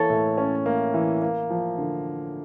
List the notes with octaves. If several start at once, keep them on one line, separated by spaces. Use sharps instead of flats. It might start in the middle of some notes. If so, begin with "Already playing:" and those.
Already playing: E3 A#3 A4 C#5
A2
C#4
A#3
E3
A#3
F3
D3